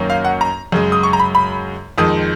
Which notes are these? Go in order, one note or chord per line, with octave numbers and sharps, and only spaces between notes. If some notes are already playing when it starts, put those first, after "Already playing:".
Already playing: F#2 D#3 A#3 C#4
F5
F#5
A#5
F#2 C#3 G#3
D#6
C#6
A#5
B5
B5
F2 D#3 G#3 D#6